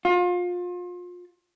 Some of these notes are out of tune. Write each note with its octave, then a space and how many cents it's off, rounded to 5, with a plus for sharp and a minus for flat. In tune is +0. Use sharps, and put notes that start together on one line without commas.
F4 +30